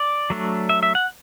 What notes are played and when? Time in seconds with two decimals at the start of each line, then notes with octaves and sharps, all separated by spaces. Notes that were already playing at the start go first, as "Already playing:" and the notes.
Already playing: D5
0.30 F#3 A3 D4
0.69 E5
0.83 E5
0.95 F#5